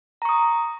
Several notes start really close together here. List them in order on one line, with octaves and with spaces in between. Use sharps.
A#5 C#6 D#6